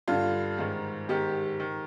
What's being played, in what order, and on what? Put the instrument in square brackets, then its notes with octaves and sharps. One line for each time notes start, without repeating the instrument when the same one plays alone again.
[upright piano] G2 D3 F4
G#2 D#3
G#2 D#3 G4
D#3